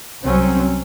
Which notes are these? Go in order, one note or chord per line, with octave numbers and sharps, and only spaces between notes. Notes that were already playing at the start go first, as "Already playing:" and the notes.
C2 F#3 C4 C#4